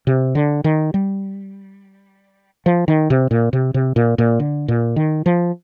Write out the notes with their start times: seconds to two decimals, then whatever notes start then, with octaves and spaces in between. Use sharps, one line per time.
0.07 C3
0.35 D3
0.64 D#3
0.94 G3
2.66 F3
2.88 D#3
3.10 C3
3.31 A#2
3.53 C3
3.74 C3
3.96 A#2
4.18 A#2
4.40 D3
4.68 A#2
4.96 D#3
5.26 F3